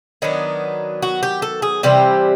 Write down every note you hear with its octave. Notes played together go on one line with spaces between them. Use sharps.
D#3 F#3 B3 D4 D#4
F#4
G4
A4
G#4
C3 E3 G3 C4 G4